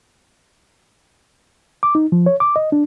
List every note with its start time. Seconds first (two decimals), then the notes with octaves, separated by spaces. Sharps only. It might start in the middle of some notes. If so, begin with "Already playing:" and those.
1.83 D6
1.95 D#4
2.12 F3
2.26 C#5
2.40 D6
2.56 D#5
2.72 D4